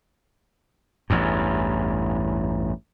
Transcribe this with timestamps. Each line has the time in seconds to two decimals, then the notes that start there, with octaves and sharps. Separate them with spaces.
1.10 A1 E2 G2